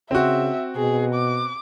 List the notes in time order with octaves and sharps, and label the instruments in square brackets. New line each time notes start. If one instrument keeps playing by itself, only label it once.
[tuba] C#3 [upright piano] C4 F#4 [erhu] E5
[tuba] B2 [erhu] G#4
[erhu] D6